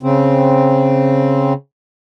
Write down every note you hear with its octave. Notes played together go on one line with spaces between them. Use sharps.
C#3 C4